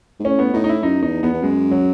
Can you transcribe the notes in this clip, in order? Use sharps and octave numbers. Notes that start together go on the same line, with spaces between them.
G#2
A2 C#4
B3
A2 D#4
D#4
E4
F#2 D#4
E2 D#4
E2 B3
E2
F#2 G#3
F#3